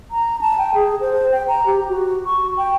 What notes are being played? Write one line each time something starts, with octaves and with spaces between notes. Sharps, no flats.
A#5
A5
G5
G#4
C5
G5
A#5
G4
F#4
C#6
G5